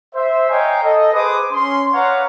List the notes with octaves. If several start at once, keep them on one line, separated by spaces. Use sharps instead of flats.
C5 E5
C#5 D#5 F5 G5 G#5 A#5
A4 D#5
G#4 B4 C5 D6 D#6
C#4 C6
B4 C#5 D5 F5 F#5 A#5